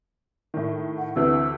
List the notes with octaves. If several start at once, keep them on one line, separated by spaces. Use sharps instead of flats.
A2 D#3
F#5
D2 C3 E3 E6